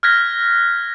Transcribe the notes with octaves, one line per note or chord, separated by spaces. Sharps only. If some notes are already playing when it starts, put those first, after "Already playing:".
F6 F#6 G#6 A#6 B6